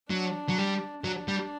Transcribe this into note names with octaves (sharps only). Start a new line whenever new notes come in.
F#3 D4
F#3
G3
F#3 D4
G3